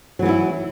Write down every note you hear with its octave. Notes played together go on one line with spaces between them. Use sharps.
E3 F#3 B3 E4